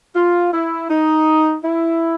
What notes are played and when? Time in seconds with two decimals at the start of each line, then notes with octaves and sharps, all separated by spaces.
0.16 F4
0.52 E4
0.90 D#4
1.63 E4